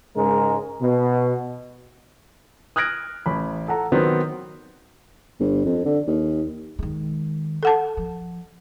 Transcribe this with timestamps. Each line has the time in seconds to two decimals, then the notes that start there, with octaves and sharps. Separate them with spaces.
0.16 G#2 C#3 G#3 C#4 A#4
0.81 B2
2.76 D#6 F6 F#6 G#6 A#6 D7
3.26 A1 B5
3.68 A4 F#5 A#5
3.92 D#3 F#3 B3 C4
5.39 G1
5.65 F2
5.85 D3
6.07 D#2
6.79 D#3 G#3
7.63 A4 F#5 A5
7.97 F3